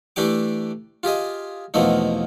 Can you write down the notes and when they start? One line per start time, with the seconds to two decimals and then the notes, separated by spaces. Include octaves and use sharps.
0.16 E3 A3 D4 G4 G5 D6
1.03 F4 G4 G#4 D#5
1.74 E2 B2 F3 A3 A#3 D#4